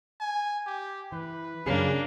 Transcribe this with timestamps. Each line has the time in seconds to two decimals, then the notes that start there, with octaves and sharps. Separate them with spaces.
0.20 G#5
0.66 G4
1.12 E3 B4
1.66 F#2 C#3 A#3 C#4 D4 G#4